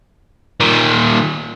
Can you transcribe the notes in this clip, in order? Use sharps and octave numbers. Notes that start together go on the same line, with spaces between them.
A#2 D#3